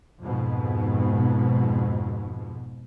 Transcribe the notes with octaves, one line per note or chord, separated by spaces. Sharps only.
F2 G#2 B2